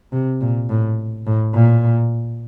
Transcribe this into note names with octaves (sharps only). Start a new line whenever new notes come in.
C3
A#2
A2
A2
A#2